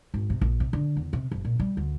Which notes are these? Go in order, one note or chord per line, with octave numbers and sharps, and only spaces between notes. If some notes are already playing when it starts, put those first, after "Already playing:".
G#1
C3
A#1
C3
D3
E2
C3
F#1
A#2
G3
D2